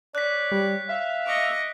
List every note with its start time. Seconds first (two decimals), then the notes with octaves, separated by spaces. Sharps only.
0.15 C#5 D5 F#6 B6
0.51 G3
0.89 E5 F5
1.25 D#5 C#6 D6